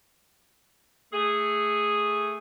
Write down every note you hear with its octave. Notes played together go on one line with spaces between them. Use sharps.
A3 G#4